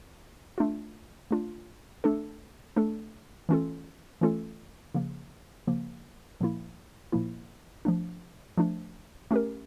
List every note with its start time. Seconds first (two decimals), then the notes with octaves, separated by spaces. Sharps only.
0.58 A3 D4 F4
1.31 A3 D4 F4
2.04 A3 D4 A4
2.76 A3 D4 A4
3.49 E3 A3 C#4 F4 A4
4.21 E3 A3 C#4 F4 A4
4.94 C#3 F3 A#3
5.67 C#3 F3 A#3
6.41 A#2 F3 A#3 E4
7.12 A#2 F3 A#3 E4
7.85 F3 A3 D4
8.58 F3 A3 D4
9.31 A3 C#4 G4 A#4